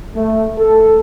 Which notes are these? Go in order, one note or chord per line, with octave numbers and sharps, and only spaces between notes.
A3
A4